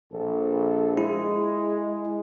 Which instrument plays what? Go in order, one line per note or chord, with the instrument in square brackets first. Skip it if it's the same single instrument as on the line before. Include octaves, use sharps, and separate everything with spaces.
[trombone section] A#1 A4
[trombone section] G#3 [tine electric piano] E4